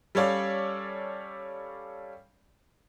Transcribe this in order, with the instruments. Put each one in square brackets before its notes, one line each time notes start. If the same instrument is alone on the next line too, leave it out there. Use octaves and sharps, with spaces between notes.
[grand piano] G3 C#4 A4 C#5 D5 F5